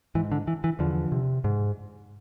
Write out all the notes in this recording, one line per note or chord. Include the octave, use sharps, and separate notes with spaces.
G#2 E3
D3
E3
E3
E2 D3 F3
C3
G#2